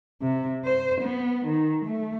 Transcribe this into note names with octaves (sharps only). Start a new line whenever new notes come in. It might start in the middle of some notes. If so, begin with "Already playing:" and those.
C3
C5
B3
D#3
A3